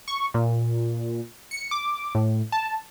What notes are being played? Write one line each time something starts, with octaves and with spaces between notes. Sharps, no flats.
C#6
A#2
C#7
D6
A2
A5